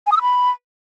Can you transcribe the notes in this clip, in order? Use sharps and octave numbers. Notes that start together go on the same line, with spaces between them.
G#5
D#6
E6
B5